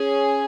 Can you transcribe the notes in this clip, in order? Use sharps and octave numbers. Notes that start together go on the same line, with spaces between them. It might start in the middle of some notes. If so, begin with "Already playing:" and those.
Already playing: C#4 G#4